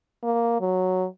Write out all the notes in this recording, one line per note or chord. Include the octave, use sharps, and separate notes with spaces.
A#3
F#3